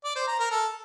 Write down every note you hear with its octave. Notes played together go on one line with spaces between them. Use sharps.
D5
C5
A#5
A#4
A4